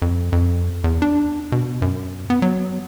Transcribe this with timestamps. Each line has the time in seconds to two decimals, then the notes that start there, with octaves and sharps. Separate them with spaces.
0.02 F2
0.32 F2
0.84 E2
1.02 D4
1.52 B2
1.82 F#2
2.30 B3
2.42 F#3